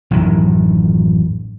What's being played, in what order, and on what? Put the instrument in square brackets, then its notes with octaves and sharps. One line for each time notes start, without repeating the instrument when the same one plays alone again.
[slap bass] A1 F#2 A2 D#3